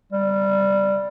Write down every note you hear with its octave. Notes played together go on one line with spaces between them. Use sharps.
G3